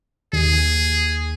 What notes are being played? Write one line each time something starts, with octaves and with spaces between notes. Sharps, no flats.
D#2 G#4